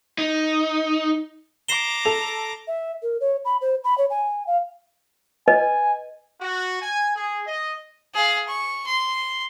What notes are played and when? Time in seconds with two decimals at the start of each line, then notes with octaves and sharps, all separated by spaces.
0.18 D#4
1.68 A#5 D6 C7 E7 G7
2.05 A4 F7
2.67 E5
3.02 A#4
3.20 C#5
3.45 B5
3.61 C5
3.84 B5
3.98 C#5
4.10 G#5
4.47 F5
5.48 B4 D#5 G#5
6.40 F#4
6.82 G#5
7.16 G#4
7.47 D#5
8.14 G#4 F5
8.48 C#6
8.87 C6